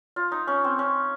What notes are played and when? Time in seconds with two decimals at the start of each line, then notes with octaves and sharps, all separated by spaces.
0.16 F4
0.32 D#4
0.47 C#4
0.64 C4
0.79 C#4